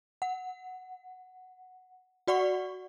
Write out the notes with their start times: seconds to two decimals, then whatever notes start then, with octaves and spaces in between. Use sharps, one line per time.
0.22 F#5
2.27 F#4 D5 F#5 C#6